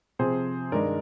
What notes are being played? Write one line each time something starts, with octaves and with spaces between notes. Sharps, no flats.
C3 F3 C4 G#4 C5
G2 D#3 G#3 A#4 D5